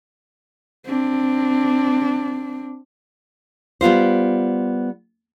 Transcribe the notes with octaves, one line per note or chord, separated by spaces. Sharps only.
C4 D4
G3 B3 F4 C5